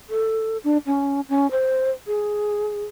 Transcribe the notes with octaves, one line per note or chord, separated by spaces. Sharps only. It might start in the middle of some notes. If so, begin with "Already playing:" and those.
A4
D4
C#4
C#4
C5
G#4